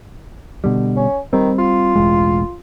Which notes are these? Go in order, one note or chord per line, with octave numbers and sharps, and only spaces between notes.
B2 D3 G3
C#4
D#3 G3 C4
F4
E1 A1 G#3